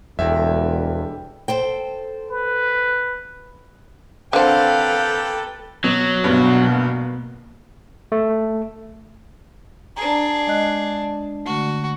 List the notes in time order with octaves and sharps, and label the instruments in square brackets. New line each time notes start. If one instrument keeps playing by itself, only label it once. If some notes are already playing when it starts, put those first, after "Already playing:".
[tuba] E1 [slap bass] E2 [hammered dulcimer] D3 G3 G#3 [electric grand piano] E5 G5
[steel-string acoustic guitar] A4 C5 G5
[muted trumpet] B4
[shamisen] D3 C4 [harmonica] A#3 G4 G5 [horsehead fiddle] A4 B4 [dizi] F5
[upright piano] B2 [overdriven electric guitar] F#3
[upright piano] G1 C2 G2 [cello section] B2 A#3 [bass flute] B3
[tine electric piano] A3
[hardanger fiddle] D4 G#4 [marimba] A#5
[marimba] G#3 D#5 F#6
[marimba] D3 A3 [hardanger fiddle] F#4